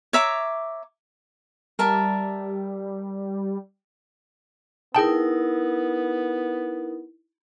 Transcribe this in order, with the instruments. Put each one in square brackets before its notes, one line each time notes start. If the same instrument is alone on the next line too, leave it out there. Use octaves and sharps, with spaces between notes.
[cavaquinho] C#5 E5 A#5 D6
[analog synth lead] G3 [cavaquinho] A#4 E5 A5
[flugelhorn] B3 [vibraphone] D#4 E4 A#4 [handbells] G#4 G5 A5